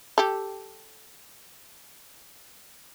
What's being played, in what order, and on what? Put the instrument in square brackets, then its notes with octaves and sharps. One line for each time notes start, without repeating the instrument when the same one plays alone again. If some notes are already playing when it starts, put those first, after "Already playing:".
[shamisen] G4 A4